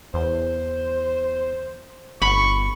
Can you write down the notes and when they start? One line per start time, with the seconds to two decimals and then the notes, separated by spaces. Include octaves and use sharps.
0.14 E2 C5
2.22 G1 B5 C#6